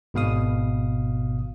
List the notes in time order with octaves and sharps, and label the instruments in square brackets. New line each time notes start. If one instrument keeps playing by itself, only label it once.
[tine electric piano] G#1 B2 F5 D#6